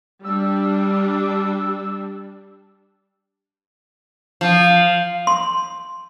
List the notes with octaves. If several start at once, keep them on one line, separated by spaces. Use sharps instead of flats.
G3 D4 E6
F3
C6